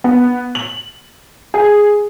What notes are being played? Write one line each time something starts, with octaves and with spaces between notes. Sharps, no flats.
B3
F#7
G#4